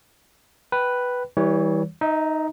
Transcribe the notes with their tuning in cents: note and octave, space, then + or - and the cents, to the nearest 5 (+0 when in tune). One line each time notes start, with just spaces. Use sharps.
B4 +0 G5 -20
E3 -30 G3 +0 C#5 +15
D#4 +0 E5 -40